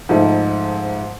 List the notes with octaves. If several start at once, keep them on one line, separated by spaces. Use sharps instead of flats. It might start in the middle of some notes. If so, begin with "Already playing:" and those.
G#2 F3 A3 D#4